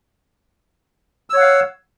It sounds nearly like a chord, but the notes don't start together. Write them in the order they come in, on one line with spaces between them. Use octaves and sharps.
E6 C#5 F#5 F5